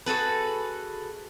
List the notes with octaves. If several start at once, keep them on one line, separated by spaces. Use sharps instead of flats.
F#4 G#4 A4 B4